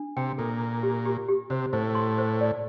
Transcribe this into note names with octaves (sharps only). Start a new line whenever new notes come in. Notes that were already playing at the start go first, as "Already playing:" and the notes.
Already playing: D4
C3 G5
A#2 A4
A#5
G4
G4
G4
C3 C5
A2 C5
C6
C5
D5